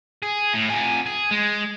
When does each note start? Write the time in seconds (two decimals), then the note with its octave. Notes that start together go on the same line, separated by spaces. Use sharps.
0.23 G#4
0.54 A2
0.70 F2 G#5
1.06 G#4
1.31 G#3